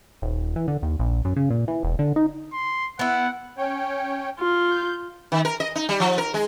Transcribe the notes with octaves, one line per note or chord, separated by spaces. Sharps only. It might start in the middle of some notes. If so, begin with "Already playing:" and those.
D#1
E3
D3
D#2
A#1
F#2
C#3
A#2
E3
E1
D3
D#4
C6
B3 E4 F#5
C#4 C#5 G5
F4
G6
D#3
A#4
D#5
D#4
G3
F3
A#4
G#3